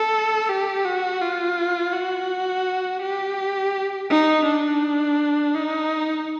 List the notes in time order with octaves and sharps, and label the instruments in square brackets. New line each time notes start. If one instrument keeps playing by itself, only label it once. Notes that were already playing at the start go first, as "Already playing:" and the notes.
Already playing: [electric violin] A4
G4
F#4
F4
F#4
G4
D#4
D4
D#4